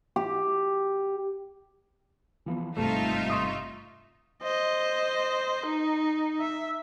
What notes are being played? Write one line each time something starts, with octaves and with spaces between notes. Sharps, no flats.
G4
E3 F3 B3
G#1 G2 C3 A3 D#4 F4 E5
C6 C#6 D#6
C5 D#5
D#4
E5